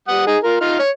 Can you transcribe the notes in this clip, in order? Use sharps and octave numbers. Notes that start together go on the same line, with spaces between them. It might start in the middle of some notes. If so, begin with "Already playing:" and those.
G3 F#5 D#6
D#4 G#4 G#5
F4 A#4
D#4 F4 F6
C#5